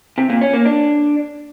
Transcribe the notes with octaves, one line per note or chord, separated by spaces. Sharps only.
C3
A#2
C#4
A#3
D4